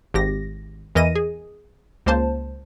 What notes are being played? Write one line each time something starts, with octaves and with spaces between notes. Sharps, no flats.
G#1 G4 A#6
E2 E3 A#4 D#5 A#6 D#7
G#4
C#2 A#3 C5 A5